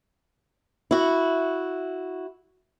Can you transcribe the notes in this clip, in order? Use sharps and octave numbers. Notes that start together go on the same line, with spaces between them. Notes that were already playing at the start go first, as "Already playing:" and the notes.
E4 F#4